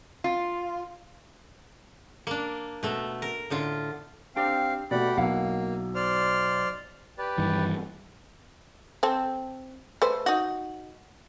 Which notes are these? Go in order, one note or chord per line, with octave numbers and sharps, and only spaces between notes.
F4
A#3 D4
B2 A3
A#4
A2 D3 F4
C4 D4 G4 F5 G5
B2 A3 G4 D5 F#5 B5
B1 A#3 E4 F5 F#5
C5 D5 F6
G4 B4 D5
G2 D#3 E3
C4 A4
A3 B4 C5
D#4 F#4